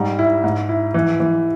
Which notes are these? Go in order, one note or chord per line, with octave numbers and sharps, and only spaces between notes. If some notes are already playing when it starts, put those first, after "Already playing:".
Already playing: G#2 G3
E4
G#2
E4
E3
E3